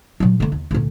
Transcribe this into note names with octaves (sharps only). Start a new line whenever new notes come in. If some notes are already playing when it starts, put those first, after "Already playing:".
A#2 F#3
D3 A#3
D#2
D2 A#2